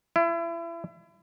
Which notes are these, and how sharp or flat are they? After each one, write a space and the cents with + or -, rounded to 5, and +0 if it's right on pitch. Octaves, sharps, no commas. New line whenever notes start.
E4 +35